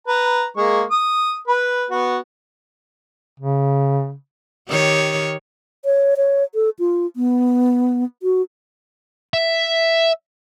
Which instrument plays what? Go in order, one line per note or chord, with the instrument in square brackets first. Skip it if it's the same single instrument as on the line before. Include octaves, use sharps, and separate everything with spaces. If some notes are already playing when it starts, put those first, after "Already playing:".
[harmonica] B4 A#5
G#3 A#3 C#6
D#6
B4 B5
B3 F#4
[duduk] C#3
[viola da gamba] D#3 G4 C#5
[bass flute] C#5
C#5
A4
F4
B3
F#4
[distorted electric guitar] E5